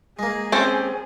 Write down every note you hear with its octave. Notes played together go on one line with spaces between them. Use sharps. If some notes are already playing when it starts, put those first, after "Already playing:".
G#3 A#3 G#4
C4 C#4 A4 C5 G5